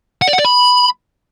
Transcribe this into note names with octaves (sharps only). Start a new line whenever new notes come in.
F#5
D5
F#5
D5
B5